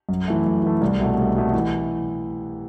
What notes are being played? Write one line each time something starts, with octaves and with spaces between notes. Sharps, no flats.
F#2
E3 A3
F#2
E3 A3
C2
B2 A3
C2
B2 A3
E3